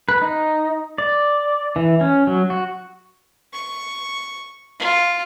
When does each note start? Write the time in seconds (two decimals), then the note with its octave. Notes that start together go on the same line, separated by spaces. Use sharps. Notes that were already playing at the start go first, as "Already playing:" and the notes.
0.09 B4
0.22 D#4
0.98 D5
1.76 E3
2.01 C#4
2.27 F#3
2.50 F#4
3.53 C#6
4.79 F4